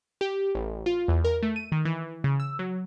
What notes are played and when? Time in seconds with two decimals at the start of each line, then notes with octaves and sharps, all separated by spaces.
0.21 G4
0.55 A1
0.86 F4
1.08 E2
1.24 A#4
1.43 A3
1.56 D#7
1.72 D#3
1.85 E3
2.24 C#3
2.40 E6
2.59 F#3